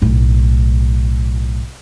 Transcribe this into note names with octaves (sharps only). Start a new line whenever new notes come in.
B1 A2